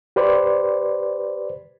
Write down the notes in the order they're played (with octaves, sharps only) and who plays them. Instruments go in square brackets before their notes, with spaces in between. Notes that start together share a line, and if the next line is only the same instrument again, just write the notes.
[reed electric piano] G4 B4 C5 D5